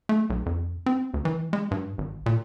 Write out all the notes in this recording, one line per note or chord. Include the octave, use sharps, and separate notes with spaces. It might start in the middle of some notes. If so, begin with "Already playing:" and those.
A3
B1
F2
C4
D2
E3
G#3
G2
G#1
A#2